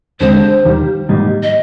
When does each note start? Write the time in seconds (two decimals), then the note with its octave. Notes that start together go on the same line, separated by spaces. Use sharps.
0.20 D#2 D3 G#3 C4 C5
0.65 D#2 D#3 G3
1.09 G#2 D#3 G3 A#3 D#4
1.43 D#5